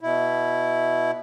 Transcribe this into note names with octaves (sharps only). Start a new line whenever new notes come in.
B2 E4